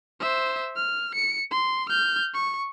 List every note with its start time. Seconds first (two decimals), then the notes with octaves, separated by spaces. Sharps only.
0.20 C5 E5
0.76 F6
1.15 C#7
1.51 C6
1.90 F6 G6
2.34 C#6